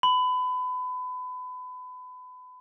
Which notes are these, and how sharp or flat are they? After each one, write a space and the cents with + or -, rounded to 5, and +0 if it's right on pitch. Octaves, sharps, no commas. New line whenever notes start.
B5 +30